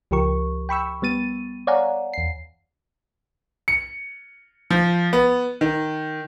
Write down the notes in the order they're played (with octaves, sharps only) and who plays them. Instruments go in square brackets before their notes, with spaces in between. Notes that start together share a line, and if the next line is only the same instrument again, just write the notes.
[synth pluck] C#2 F3 G4 A#4 C#6
G5 B5 C#6 E6
G3 B3 A6 D#7
C#5 D5 F5 F#5 G#5 A#5
E2 C7
[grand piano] C#7
F3
B3
D#3